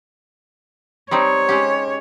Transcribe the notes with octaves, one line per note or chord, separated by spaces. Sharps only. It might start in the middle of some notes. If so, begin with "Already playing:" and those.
G3 C4 D#4 C#5
G#3 C#4 G4